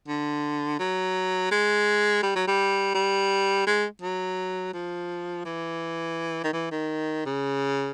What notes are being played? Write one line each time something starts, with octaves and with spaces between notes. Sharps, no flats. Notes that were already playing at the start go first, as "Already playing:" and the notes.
D3
F#3
G#3
G3
F#3
G3
G3
G#3
F#3
F3
E3
D#3
E3
D#3
C#3